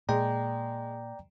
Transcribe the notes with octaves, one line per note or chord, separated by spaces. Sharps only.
A#2 G#3 D5 G5 A#5